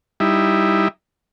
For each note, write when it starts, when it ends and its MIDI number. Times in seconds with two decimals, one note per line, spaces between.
0.20 0.88 55
0.20 0.88 63
0.20 0.88 64